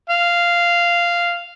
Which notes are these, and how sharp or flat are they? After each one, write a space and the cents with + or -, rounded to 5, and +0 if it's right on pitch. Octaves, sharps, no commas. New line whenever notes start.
F5 -10